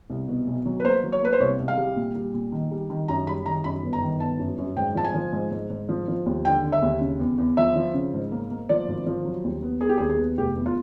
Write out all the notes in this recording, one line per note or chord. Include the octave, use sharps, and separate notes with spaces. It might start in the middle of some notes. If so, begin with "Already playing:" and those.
C2
B2
B1
F#3
B4
A#3 C5
F#3
C#5
A#3 B4
C5
C2 C#5
C2
F5
G3
A#2
G3
A#2
D#3
G3
D#3
F#2 A#5
G3 B5
D#3 A#5
F#2 B5
G1
A#5
D#3
G1 A5
F#2
F#2
G#2 G5
F3 A5
G#5
F3
G#2
G#2
G#2
F3
F3
D#2
D3 G5
D3
E5
D#2
C#3
E2
E2
F3 E5
F3
C#3
G#2
A#3
A#3
F3 D5
G#1
F3
F#3
D#2
B3
B3 G#4
G4
D#2 G#4
G#4
B3
F1 G4
E2
F4